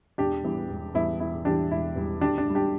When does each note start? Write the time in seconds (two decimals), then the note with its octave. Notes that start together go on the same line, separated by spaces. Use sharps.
0.18 E1 D4 G4
0.43 E2 E3 G3
0.69 E1
0.94 E2 E3 G3 E4
1.20 E1 E4
1.45 E2 E3 G3 D4 G4
1.71 E1 E4
1.96 E2 E3 G3
2.21 D2 D4 G4
2.38 D4
2.47 D3 G3
2.55 D4 G4